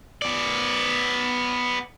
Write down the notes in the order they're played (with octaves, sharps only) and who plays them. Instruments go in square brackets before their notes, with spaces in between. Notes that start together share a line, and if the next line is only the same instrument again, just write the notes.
[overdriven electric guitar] B3 D5